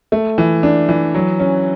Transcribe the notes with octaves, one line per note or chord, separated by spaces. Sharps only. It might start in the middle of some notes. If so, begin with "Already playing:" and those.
A3
E3
D4
E3
F#3
C#4